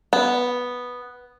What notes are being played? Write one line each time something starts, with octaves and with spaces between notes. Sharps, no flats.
B3